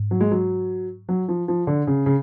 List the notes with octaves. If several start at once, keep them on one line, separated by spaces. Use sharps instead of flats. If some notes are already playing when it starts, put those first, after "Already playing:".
Already playing: G#2
F#3
G#3
F#3
F#3
F3
F3
D3
C#3
C#3